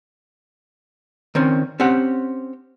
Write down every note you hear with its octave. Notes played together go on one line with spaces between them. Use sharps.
D#3 C4 C#4
C4 C#4 G4 F#5